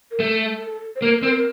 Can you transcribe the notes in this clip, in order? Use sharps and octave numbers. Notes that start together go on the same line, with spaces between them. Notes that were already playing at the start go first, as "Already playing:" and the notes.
A#4
A3 A4
C5
A#3 A#4
A#4
C4
A#4